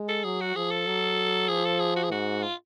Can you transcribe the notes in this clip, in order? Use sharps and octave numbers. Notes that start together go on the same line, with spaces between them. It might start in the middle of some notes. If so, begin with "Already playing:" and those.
Already playing: G#3
A4
F#3 G#4
F#4
F3 G#4
A4
F#3
F3 G#4
A4
G#4
F#4
G#4
G#2 F#4
F4